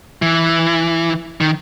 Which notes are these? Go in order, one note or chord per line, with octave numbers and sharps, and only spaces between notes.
E3
D#3